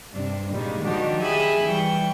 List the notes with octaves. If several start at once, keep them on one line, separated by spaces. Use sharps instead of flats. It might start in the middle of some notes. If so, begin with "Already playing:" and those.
G2 C3 D4
A#2 D#3 G3 G#3
D#3 F3 D4 F#4 G4
G4 G#4 E5 G#5 B5 F#6
E3 G3 G5 C#6